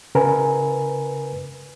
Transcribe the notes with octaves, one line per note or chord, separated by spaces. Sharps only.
C#3 A#4 B4 G#5